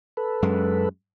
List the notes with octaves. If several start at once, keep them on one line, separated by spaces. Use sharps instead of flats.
A4 B4
F#2 G#3